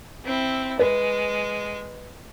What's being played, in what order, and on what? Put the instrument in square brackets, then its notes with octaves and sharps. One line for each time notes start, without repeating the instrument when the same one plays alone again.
[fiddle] C4 E4
[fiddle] G#3 [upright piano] B4